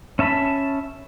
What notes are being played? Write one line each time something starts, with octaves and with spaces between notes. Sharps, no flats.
C#4 E5 A5 B5